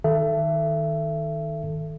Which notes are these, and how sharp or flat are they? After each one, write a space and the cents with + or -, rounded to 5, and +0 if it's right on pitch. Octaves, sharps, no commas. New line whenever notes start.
D#3 +0 A4 +0 E5 +25